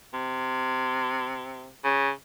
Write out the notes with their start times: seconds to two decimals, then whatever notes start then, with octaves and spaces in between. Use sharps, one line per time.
0.14 C3
1.84 C#3